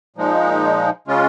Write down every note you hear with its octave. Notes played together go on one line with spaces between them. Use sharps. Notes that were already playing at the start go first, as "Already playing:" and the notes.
A#2 F3 G#3 D#4
C#3 G#3 C#4 F4